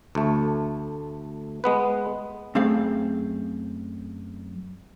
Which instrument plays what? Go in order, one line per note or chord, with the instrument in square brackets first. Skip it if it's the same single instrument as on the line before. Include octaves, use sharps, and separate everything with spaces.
[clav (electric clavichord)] D2 A3
G#3 B3 B4
[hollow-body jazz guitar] F#2 A3 C4 G#4 F5